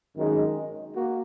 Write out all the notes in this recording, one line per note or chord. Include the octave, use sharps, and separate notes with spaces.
G#1 F#2 D#3 G#3 D#4
A#3 F#4